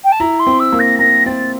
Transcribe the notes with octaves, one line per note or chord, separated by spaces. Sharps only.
G5
A5
E4 A#5
C6
C4
E6
A#3
A#6
A#3 A#6
C4 A6